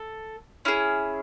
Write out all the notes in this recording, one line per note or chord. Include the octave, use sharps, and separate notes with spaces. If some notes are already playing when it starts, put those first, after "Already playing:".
Already playing: A4
C#4 E4 G#4